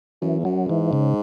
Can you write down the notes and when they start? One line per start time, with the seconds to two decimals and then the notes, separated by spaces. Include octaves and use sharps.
0.22 F#2 E3
0.39 E2
0.45 F#2 F#3
0.69 G#2 E3
0.93 C#3